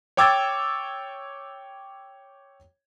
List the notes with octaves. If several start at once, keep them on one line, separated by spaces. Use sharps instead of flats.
C#5 G5 D6 E6 G#6 A6